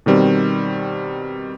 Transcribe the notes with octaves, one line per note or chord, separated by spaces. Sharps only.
B2 D#3 G3 C4